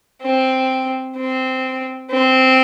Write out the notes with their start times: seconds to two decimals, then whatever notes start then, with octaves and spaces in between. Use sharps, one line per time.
0.22 C4
1.16 C4
2.11 C4